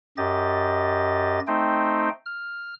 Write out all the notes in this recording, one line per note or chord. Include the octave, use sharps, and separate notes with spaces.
F#2 G4 D#5 A6
A3 C4 D#4 C5 G5
F6